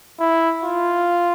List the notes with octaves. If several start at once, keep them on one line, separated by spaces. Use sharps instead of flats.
E4
F4